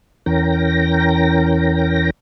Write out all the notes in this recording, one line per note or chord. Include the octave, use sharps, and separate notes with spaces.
E2 E3 C#4 A#4 G5 A#6